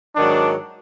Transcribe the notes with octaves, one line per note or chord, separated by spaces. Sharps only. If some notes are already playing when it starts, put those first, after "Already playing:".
G#2 D#3 F#3 D4